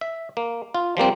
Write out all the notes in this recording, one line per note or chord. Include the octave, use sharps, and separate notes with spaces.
E5
A#3
F4
F3 G3 A#3 C4